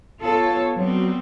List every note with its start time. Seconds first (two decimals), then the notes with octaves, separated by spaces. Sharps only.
0.22 B3 F4 A4 C#5
0.76 F#3 G3 B3 C4